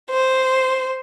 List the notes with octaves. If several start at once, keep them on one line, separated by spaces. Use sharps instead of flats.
C5